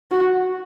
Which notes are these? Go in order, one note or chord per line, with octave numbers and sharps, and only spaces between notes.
F#4